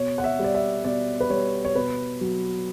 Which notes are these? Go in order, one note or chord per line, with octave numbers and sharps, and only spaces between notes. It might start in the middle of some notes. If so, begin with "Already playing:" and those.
Already playing: B2 C#5
F#5
E5
G3
D5
E5
B2 D5
B4
G3 C#5
C#5
B2 B4
F#3